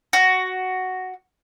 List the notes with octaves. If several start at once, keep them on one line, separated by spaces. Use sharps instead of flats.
F#4